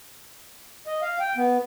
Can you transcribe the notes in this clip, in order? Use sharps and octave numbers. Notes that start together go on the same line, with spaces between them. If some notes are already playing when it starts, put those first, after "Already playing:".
D#5
F5
G5
B3